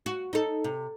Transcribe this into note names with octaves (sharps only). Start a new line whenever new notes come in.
F#4
D#4 A4
C3